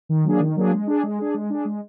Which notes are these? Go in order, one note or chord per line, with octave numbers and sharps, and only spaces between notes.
D#3
F#3 A#3 D4 G#4
D#3
F#3 A#3 D4 G#4
G#3
D4 G#4
G#3
D4 G#4
G#3
D4 G#4
G#3